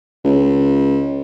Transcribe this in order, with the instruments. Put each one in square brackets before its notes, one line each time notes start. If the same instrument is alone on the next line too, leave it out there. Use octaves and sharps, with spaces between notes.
[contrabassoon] C#2